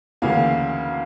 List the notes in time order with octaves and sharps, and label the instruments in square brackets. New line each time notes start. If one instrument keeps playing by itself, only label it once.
[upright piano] D2 C#3 E3 A#3 C#4 F5